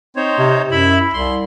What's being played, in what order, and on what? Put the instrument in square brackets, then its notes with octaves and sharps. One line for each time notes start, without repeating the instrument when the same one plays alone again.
[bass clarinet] C4 [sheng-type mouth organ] D#4 C5 C#5
[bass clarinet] C3
[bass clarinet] F#2 [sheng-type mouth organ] E4 E5 B5
[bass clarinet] C2 [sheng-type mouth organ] C6